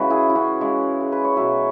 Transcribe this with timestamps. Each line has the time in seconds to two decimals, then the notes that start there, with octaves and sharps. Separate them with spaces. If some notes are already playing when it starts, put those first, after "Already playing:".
Already playing: C#3 E3 G#3 F#4 B4
0.10 E4 G#4
0.30 E4
0.36 C#4 F#4
0.61 C#3 E3 G#3
1.00 G#4
1.12 B4
1.24 C#5
1.36 B2 F#3 B4 E5